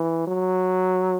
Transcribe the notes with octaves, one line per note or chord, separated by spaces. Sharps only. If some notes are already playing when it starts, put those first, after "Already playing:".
Already playing: E3
F#3